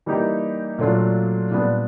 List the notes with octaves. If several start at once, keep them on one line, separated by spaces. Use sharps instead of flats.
E3 G3 A#3 D#4 G4
A#2 F#3 A3 D4 F4
A#2 G3 B3 D4